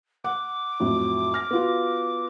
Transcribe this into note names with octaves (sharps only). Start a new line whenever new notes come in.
F#5 D6
F2 A2 F#3
F6 A#6
B3 F4 F#4